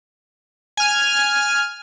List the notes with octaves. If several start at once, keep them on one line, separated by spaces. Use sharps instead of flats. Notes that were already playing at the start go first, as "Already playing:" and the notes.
G#5 F6